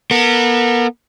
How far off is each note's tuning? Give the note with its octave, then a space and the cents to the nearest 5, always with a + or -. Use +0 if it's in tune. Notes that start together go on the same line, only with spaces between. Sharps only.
B3 -35 A#4 -40